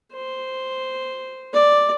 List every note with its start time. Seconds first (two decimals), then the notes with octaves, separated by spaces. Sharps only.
0.14 C5
1.54 D5